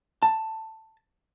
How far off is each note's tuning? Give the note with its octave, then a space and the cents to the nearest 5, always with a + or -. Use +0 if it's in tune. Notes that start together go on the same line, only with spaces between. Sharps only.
A5 +10